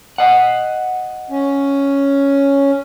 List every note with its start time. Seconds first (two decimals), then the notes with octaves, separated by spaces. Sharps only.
0.18 D#5 F#5
1.30 C#4